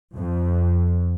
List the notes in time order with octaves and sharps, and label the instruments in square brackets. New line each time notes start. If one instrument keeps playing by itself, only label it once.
[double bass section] F2